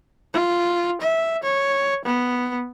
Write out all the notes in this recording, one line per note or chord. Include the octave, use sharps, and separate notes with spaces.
F4
E5
C#5
B3